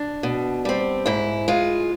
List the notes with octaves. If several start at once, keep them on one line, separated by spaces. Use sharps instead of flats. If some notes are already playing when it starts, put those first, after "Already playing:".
Already playing: D4
B2
G3 C4
G#2 E4
G#3 F4